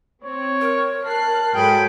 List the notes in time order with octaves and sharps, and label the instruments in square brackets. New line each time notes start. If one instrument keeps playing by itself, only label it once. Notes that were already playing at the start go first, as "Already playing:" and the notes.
[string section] C4 [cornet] C#5
[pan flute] A#4
[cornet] A5 [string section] F#6 C7
[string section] G#2 F#3 A4 [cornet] G#4 [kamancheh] G5 B5